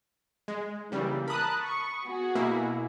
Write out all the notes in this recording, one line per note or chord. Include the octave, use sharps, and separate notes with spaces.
G#3
C#3 E3 G3 A#3
A#4 A5 B5 D#6 F#6
C#6
B3 F#4 G#4
B2 A#3 E4